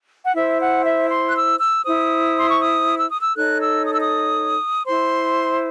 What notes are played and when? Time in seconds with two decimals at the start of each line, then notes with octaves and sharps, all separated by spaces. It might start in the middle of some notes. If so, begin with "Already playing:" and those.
0.25 F#5
0.34 E4 C5 E5
0.60 F#5
0.85 E5
1.09 C6
1.28 F#6
1.35 E6
1.60 E6
1.85 E4 C5 D#6
2.38 C6
2.49 C#6
2.60 D#6
2.97 E6
3.09 D#6
3.20 E6
3.35 D#4 A4 C#5 F#6
3.60 E6
3.86 D#6
3.92 E6
3.99 D#6
4.85 E4 C5 C6